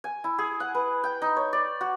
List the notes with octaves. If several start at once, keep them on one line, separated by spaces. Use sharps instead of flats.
G#5
E4
G#4
F#5
B4
G5
D#4
C#5
D5
F#4